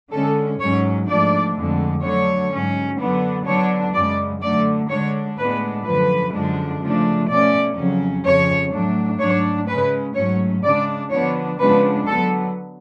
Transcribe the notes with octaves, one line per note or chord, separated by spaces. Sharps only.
D3 G#3 C#4 A4
G#2 F#3 C#4 C#5
G#2 F3 A3 D4 D5
F2 D3 G#3
D3 F#3 A3 C#5
G#2 F#3 C#4
F#2 D3 F#3 B3 D4
D3 F#3 B3 D4 C#5
F#2 C#3 G#3 D5
D3 F#3 A3 D5
D3 G#3 D4 C#5
A2 G#3 B3 D4 B4
F#2 D3 F3 B4
F#2 D3 F3 G#3 D4
C#3 F3 A3 D4
B2 A3 C#4 D5
F2 C#3 F#3 C#4
F2 C#3 F3 C#5
A2 F#3 A3 D4
G#2 F#3 A3 D4 C#5
C#3 G#3 C#4 B4
G#2 F#3 A3 C#4 C#5
C#3 G#3 D4 D5
D3 F3 B3 D4 C#5
C#3 F3 G#3 B3 D4 B4
D3 F#3 B3 A4